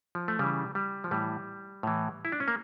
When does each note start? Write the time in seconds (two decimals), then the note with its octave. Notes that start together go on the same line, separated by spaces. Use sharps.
0.15 F3
0.28 A3
0.39 C#3 E3 G3
0.75 G3
1.04 F3
1.11 A2 E3 G3
1.83 A2 E3
2.25 E4
2.32 D4
2.40 C#4
2.48 A#3